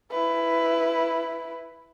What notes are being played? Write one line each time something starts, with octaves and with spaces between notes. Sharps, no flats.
E4 B4